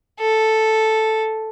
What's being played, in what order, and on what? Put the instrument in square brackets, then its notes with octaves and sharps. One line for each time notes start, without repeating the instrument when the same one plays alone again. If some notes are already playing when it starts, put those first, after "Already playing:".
[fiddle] A4